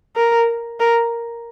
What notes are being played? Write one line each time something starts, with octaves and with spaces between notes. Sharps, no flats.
A#4
A#4